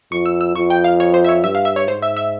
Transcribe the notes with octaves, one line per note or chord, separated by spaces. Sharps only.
F2 C#6
E6
E6
F2 C#6
G5
F5
C#5
C5
E5
C#5
G2 E5
F5
E5
C#5
G#2 C5
E5
E5